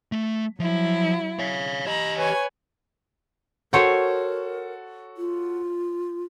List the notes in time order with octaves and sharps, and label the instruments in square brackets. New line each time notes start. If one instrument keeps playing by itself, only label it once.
[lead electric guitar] A3
[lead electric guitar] F3 [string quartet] F#3 E4
[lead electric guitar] C#5 F5
[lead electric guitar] G4 D#5 [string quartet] A#5 B5
[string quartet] B4 C#5 G#5
[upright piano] F#4 A4 [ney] A#4 [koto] C5 C#5 G5
[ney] F4